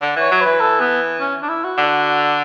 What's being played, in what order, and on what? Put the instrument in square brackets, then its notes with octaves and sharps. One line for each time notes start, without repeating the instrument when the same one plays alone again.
[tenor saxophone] D3
[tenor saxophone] E3 [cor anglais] C#5
[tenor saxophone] F#3
[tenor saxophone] E3 [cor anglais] B4
[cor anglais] A4
B3
C#4
D4
E4
F#4
[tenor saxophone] D3